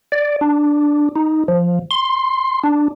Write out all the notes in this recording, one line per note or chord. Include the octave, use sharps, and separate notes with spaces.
D5
D4
D#4
F3
C6
D4